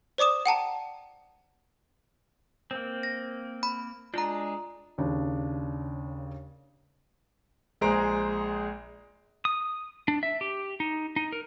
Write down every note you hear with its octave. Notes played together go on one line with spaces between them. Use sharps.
C5 D5 D6 D#6 E7
F#5 G5 A5 A#5
A#3 C4
A#6
B5
G#3 D4 F4 A#5
D#2 C#3 D4
A#1 G#3 G#4 C5 A#5 D7
D#6
D4
E5
G4
D#4
D#4
A#4